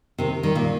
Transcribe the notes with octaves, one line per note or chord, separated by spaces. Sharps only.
C3 D#3
D#3 G3
A#2